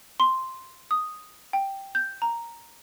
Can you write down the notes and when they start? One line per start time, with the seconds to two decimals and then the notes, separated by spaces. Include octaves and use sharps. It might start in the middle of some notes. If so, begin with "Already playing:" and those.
0.20 C6
0.91 D#6
1.53 G5
1.95 G6
2.22 A#5